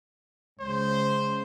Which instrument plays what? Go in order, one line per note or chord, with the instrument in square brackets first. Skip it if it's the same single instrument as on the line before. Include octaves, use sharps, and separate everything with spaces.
[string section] C#2 C#3 [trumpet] C5